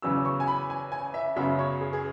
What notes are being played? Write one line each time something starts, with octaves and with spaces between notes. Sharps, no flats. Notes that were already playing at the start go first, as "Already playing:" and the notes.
E2 C#3 F#3 C#4 E6
C#6
G#5
B5
G#5
G#5
E5
F#2 C#3 F#3 B3 E5
C#5
G#4
G#4